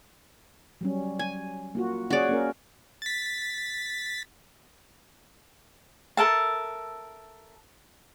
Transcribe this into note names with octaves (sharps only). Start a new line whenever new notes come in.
F#3 G3 C#4
G#5
A#3 F4 F#4
C#4 F#4 G#4 C#5 D5
A#3 C#4 A#4
A6 B6
A4 A#4 E5 A5